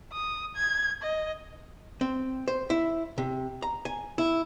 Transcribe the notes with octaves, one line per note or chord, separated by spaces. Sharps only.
D#6
G#6
D#5
C4
C5
E4
C3
A#5
G#5
E4